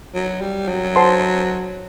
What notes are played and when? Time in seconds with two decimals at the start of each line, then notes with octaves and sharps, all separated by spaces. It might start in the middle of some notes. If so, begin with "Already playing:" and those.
0.15 F#3
0.41 G3
0.68 F#3
0.96 C5 F#5 A5 C6